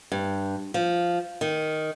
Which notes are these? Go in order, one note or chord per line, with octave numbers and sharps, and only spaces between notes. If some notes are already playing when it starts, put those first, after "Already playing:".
G2
F3
D#3